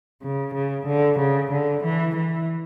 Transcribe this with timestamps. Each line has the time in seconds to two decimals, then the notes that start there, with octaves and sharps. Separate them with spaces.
0.22 C#3
0.55 C#3
0.87 D3
1.19 C#3
1.52 D3
1.84 E3
2.16 E3